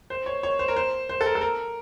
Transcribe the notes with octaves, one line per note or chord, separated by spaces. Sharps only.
C5
C#5
C#5
C5
A#4
C5
C5
A4
A#4
A4
A#4